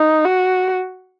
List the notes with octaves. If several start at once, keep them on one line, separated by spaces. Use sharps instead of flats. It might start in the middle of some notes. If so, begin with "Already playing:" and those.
Already playing: D#4
F#4